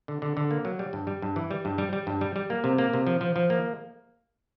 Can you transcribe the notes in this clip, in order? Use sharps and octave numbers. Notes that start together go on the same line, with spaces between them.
D3
D3
D3
A#3
F#3
G3
G2
G3
G2
E3
G3
G2
G3
G3
G2
G3
G3
A#3
C3
A#3
C3
F3
F3
F3
A#3